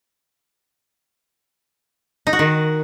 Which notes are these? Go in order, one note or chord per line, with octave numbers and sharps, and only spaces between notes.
D#4
F#4
D#3